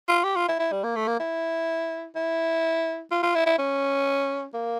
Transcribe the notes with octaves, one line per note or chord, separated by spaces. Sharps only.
F4
G4
F4
E4
E4
G3
A#3
A3
A#3
E4
E4
F4
F4
E4
E4
C#4
A#3